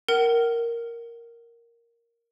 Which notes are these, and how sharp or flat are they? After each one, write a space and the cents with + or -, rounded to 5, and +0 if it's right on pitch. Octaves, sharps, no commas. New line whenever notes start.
A#4 +0 F#5 +35